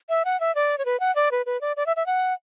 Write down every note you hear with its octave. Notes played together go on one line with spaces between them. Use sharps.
E5
F#5
E5
D5
C#5
B4
F#5
D5
B4
B4
D5
D5
E5
E5
F#5